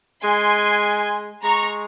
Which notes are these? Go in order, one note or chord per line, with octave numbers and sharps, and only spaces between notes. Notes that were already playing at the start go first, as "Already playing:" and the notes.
G#3 G#5 C6
G#3 A#5 C#6